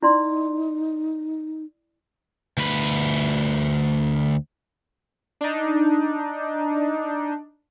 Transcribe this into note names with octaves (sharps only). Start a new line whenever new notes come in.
D#4 E4 D5 C6
D2 B4
D4 D#4